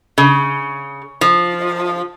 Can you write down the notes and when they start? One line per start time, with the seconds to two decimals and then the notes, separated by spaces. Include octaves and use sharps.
0.18 C#3
1.21 F3